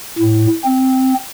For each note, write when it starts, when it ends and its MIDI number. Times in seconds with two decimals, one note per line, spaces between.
0.18 0.46 45
0.64 1.14 60